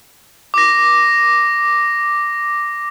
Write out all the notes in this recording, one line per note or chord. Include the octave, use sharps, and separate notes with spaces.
D6 A#6